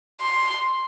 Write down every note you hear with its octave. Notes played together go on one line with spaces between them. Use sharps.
C6